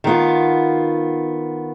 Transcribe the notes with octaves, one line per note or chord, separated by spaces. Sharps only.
D#3 B3 F4